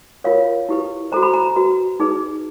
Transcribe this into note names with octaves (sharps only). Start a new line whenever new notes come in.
F4 A#4 C#5 F5
E4 G4 B4
F#4 A4 C5 A#5
B5
A#5
F#4 B4
D#4 G#4 B4